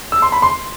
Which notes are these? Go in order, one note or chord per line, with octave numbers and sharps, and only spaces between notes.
E6
C6
B5
C6